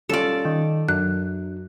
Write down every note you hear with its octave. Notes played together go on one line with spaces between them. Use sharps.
G3 C#4 F4 A4 D5
D#3
F#2 D4 F#6